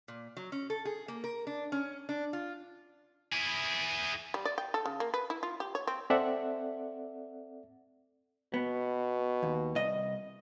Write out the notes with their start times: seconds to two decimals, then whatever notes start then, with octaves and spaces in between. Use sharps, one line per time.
0.08 A#2
0.37 F#3
0.52 C#4
0.70 A4
0.85 G#4
1.08 A#3
1.24 A#4
1.47 D4
1.72 C#4
2.09 D4
2.33 F4
3.33 E4 G#4
4.34 G3
4.45 D5
4.58 G5
4.74 A4
4.86 C#3
5.00 A#3
5.14 B4
5.30 E4
5.43 F4
5.60 G4
5.75 C#5
5.87 C4
6.10 C4 A4 D5 E5 F#5
8.54 B2 B3
9.43 D#2
9.75 C2 D#5